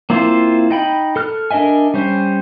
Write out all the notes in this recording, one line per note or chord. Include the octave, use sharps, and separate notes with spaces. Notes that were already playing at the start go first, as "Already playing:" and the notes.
A#3 C4 E4 F4 C5
D#4 G5 B5
A4 F6 F#6
D4 A#4 D#5 E5 G#5
G3 C#4 C5